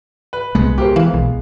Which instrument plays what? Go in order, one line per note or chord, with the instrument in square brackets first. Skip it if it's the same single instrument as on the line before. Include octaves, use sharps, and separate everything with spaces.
[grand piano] B4
[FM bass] C2 [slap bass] G#3 B3
[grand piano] G4 A#4 C5
[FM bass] E3 [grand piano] F5
[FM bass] B1